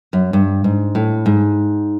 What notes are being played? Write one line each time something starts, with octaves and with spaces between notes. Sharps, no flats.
F#2
G2
G#2
A2
G#2